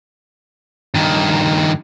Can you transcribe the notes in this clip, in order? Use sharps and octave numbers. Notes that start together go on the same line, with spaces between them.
G2 D#3